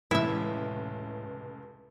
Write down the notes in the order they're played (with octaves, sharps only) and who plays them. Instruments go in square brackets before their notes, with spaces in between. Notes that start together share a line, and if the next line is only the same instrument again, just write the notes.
[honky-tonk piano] F1 C#2 [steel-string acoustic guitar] A2 [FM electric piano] E3 [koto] E4 E5